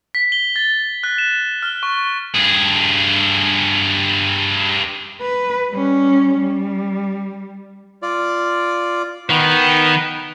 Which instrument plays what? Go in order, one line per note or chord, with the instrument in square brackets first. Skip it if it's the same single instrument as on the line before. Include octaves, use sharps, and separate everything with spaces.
[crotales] B6
G7
A6
F#6
E7
F6
C#6
[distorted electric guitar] G2 G#4
[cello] B4
G3 C#4
G3
[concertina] F4 D5
[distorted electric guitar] D#3 [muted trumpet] B3